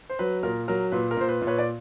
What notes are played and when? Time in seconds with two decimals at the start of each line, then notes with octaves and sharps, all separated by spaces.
0.10 C5
0.19 F#3 B4
0.43 A#2 A#4
0.68 F#3 A#4
0.92 A#2 B4
1.11 A#4
1.17 A#2 C5
1.29 B4
1.42 A#2
1.47 B4 C#5
1.58 D5